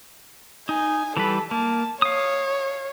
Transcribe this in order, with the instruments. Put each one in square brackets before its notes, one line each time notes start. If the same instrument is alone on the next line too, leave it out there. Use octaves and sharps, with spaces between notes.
[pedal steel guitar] D#4 [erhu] G#5
[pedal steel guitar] E3 G3 B4 [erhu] A4
[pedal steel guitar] A#3 [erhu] A5
[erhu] C#5 [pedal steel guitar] F5 D#6